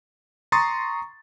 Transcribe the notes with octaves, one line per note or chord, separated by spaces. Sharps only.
A#5 C6 C#6 D#6 A6